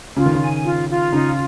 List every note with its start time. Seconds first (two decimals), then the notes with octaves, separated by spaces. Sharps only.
0.16 C#3 F4
0.26 D#3
0.34 C#3
0.40 G#5
0.65 F4
0.89 F4
1.12 C#3 D#4